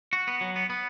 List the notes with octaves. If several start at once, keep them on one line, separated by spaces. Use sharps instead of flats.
F#4
B3
F#3
B3
B3